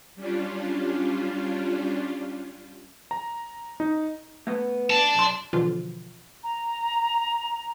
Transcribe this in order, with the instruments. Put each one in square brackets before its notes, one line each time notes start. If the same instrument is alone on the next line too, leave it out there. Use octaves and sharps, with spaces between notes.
[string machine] G3 C#4 D4 F4
[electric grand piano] A#5
D#4
[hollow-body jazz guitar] A3 B3
[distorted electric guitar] D5 A5
[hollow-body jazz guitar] B1 C6
[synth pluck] B2 D3 E3 F3 F4
[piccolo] A#5